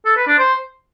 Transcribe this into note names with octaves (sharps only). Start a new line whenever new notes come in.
A4
B4
D4
C5